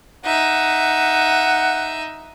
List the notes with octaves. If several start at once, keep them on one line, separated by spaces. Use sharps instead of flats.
D#4 E5 F#5